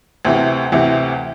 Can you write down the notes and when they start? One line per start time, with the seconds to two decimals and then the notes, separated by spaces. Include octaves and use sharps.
0.25 D2 C3 E3
0.72 D2 C3 E3